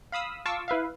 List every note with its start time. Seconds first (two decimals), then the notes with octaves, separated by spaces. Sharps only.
0.12 F5 B5 D#6 E6
0.46 F4 F5 A5 C#6 D6 E6
0.68 E4 B4 E5 F5